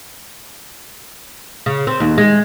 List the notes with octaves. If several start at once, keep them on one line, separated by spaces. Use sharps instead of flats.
C#3
C4
D#2
G#3